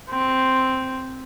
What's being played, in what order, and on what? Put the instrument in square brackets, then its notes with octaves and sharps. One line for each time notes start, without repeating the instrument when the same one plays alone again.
[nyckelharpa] C4